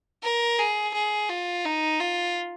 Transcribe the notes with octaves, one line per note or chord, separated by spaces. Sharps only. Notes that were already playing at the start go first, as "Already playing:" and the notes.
A#4
G#4
G#4
F4
D#4
F4